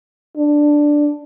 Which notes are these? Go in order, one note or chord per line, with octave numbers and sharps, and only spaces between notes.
D4